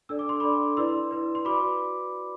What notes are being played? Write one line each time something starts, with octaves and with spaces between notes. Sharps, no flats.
D4 A4 D5 E6
D6
C6
D4 A4 D5 B5 D6
E4 B4 D5 C6 E6
E4 B4 D5
C6
F#4 B4 D5 B5 D6